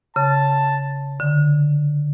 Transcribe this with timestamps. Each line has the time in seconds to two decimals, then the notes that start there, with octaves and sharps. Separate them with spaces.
0.16 C#3 A5
1.20 D3